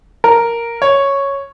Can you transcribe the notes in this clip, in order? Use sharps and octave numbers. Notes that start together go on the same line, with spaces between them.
A#4
C#5